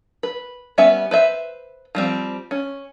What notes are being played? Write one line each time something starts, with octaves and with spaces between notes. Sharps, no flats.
B4
G3 B3 C#4 E5
B4 C5 E5
F3 G3 C4
C#4